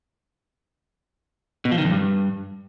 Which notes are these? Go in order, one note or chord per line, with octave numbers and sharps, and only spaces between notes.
B2
F3
D#3
F2
G2